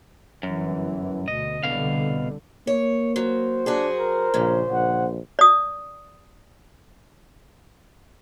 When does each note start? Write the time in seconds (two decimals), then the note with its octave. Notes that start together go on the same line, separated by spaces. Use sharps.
0.43 G1 F#2 E3
1.28 D2 B2 D#5
1.64 C2 B2 D3 F5
2.67 A#3 C#5
3.16 F#3 C5
3.66 F#3 D4 F#4 G#4
3.98 A#4
4.34 A#1 A#2 C#3
4.72 A#1 F#5
5.39 D5 D#6